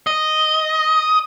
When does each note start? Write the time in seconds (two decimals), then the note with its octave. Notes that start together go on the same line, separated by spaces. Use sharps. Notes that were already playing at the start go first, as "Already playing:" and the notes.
0.07 D#5